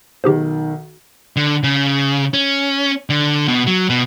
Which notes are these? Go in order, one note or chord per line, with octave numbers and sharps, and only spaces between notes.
B1 D#3 G4 G#4 C5
D3
C#3
C#4
D3
B2
F#3
B2